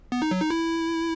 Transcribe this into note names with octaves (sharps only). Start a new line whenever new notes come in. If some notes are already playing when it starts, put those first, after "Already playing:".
B3
D#4
F#3
D#4
E4